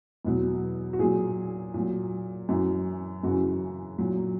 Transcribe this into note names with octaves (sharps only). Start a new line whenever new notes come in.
E2 B2 F#3
F#4
A#2 F#3 G#4
A#2 F#3
F#2 E3 F#4
F#2 C#3 E3 F#4
A#2 F#3